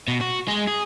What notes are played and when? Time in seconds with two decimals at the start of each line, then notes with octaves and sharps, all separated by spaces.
0.08 B2
0.21 F#4
0.48 G#3
0.67 G#4